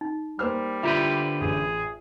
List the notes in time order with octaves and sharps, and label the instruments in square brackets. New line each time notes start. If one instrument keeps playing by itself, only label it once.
[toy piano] D#4
[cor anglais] G3 [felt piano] A#3 C5 F6
[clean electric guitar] D3 G4 B4 [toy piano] E4 F4 E5
[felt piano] A1 [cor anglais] G#4